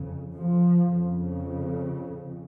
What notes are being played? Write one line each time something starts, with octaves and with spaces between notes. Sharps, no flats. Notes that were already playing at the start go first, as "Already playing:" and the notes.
Already playing: F2 C#3
F3
F2 C#3